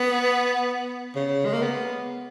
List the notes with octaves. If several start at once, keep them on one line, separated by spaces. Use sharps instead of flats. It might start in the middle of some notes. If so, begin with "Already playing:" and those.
Already playing: B3
C#3
G#3
A#3
B3